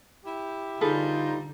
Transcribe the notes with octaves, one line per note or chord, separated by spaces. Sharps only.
E4 G4
D3 G3 D#4 F4 G#4 A4 B4